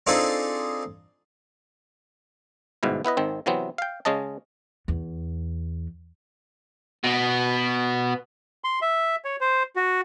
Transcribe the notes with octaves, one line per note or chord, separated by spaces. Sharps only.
C4 D4 D#4 F4 G#4 A4
G1 G#2 B2 E4
B3 E4 B4 D#5
G#1 D#3 C4
C3 E3 F#3 B3 C4
F5 G5
C#3 G#3 C#4 D#5 A5
E2
B2 B3
C6
E5
C#5
C5
F#4